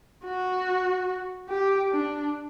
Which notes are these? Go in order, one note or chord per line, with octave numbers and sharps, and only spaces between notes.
F#4
G4
D4